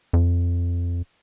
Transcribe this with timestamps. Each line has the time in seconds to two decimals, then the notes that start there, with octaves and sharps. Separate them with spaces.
0.13 F2